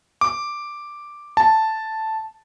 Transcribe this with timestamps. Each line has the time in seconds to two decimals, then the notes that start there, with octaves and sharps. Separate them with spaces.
0.21 D6
1.37 A5